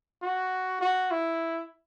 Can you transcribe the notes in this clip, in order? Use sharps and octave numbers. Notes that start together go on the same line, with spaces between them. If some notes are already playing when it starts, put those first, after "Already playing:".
F#4
F#4
E4